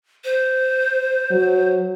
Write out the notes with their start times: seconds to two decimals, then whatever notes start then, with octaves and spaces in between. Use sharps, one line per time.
0.25 C5
1.31 F#3